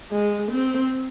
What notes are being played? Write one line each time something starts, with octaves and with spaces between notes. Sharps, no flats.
G#3
C4